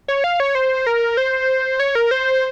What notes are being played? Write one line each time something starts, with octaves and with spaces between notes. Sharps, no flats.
C#5
F5
C#5
C5
A#4
C5
C#5
A#4
C5